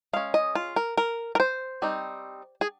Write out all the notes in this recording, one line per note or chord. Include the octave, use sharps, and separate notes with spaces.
G#3 C#4 F5
D#5
F4
A#4
A#4
A#4
C5
G3 C4 D#4
G#4